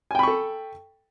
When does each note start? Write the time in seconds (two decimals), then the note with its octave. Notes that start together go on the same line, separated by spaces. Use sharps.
0.11 G#5
0.15 G5
0.19 B5
0.23 C#6
0.27 A4